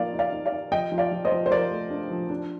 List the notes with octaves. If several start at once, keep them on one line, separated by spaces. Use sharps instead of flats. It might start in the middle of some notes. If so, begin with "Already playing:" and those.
Already playing: F3 A#3 D#4 D5 F5
D#4
D5 F5
D#4
D5 F5
D#4
F3 D#5 G5
F3
D5 F5
F3
C5 D#5
F3
C5
F3 A#4 D5
A3
D4
F3
D4